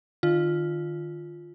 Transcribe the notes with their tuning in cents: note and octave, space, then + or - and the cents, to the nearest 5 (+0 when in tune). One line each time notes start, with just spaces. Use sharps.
D#3 -40 F4 +0